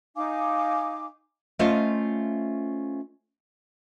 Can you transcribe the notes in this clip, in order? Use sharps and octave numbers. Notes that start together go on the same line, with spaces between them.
D#4 F5 G#5 D6
A3 C#4 F4 C5 D#5 F5